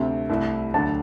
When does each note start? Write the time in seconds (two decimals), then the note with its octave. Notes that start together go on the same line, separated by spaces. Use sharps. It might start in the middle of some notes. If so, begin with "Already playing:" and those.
Already playing: D2 C3 A3 C4 E5
0.29 C2 C3 A3 E4
0.74 D2 D3 A3 A5